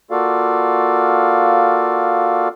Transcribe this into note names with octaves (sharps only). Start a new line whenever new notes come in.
A#3 F4 F#4 A4 D5 F5